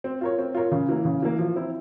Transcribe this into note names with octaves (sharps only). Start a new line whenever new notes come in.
C4
F4 A#4 C#5
C4
F4 A#4 C#5
C#3
E3 A#3
C#3
E3 A#3
F3
C4 E4